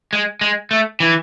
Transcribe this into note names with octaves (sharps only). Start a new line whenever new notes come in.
G#3
G#3
A3
E3